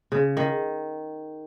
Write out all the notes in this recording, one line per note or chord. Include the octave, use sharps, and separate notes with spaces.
C#3
D#3